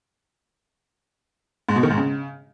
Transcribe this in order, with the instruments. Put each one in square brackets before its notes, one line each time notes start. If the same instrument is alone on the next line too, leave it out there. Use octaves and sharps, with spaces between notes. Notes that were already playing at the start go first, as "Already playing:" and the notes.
[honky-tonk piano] G#2
B2
D#3
G#2
C#3